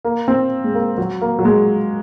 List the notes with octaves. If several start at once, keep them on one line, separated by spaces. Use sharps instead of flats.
A#3
C4
G#3
A#3
F#3
A#3
F#3
G#3